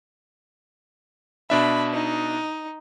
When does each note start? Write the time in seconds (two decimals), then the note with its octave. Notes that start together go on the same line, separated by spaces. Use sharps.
1.50 B2 D4 E5 B5
1.93 D#4